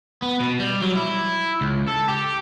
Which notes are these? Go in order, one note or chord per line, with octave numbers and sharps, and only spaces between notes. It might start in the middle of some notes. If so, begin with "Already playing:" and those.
B3
B2
G3
F#3
E4
C#2
A4
G4